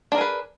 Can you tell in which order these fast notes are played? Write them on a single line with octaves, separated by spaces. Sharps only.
D4 A#4 G#4 B4